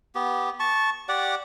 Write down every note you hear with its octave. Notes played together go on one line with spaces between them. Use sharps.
B3 G4
A5 C#6
G4 D5 F#5